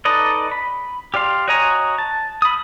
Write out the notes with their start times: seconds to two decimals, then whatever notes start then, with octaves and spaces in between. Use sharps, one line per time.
0.05 D#4 A4 B4 D5 D#5
0.51 B5
1.14 G4 D5 F5 C6
1.48 F#4 C#5 D#5 G#5 A#5
1.98 A5
2.42 B5 D#6